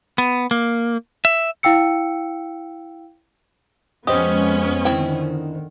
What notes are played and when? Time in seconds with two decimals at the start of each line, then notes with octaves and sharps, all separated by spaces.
0.18 B3
0.51 A#3
1.25 E5
1.63 E4 F5 G5 E6 C#7
4.07 F2 G#3 B3 C#4 G4 C5 D#5 D#6
4.85 D3 D#3 C4 E4 G5